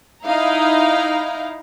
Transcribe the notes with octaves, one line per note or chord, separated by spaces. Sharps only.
D#4 E4 F5 A#5